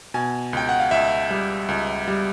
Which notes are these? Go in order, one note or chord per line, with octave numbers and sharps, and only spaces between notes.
B2 G#5
C#2 G5
F#5
F5
C#2 E5
G3
C#2
G3